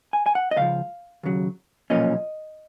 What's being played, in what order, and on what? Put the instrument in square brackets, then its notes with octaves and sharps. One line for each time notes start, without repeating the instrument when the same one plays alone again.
[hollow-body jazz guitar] G#5
G#5
F#5
D#5
C#2 C#3 F3 F5
D#2 C#3 F#3
B1 A#2 F3 A#3 C#4 D#5